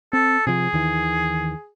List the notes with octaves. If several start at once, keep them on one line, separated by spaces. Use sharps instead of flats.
C4 A4
C3 F3 G#4
D#2 D#3 E3